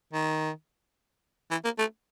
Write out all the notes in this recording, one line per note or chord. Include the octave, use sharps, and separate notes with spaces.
D#3
E3
A#3
A3